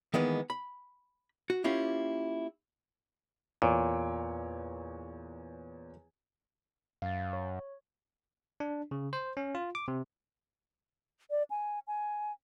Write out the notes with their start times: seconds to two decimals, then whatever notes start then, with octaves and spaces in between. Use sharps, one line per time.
0.14 D#3 E3 G#3 A#3 B3
0.50 B5
1.50 F#4
1.64 A#3 C#4 E4 F4 G4
3.62 E2 A#2 C#5 D7
7.02 F#2 F5 A6
7.33 C#5
8.60 D4
8.91 C#3
9.13 C5
9.37 C#4
9.55 F4
9.75 D6
9.88 C3
11.30 D5
11.50 G#5
11.87 G#5